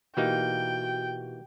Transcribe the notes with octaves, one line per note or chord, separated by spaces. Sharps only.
B2 E3 A#3 D#4 F#4 G4 G5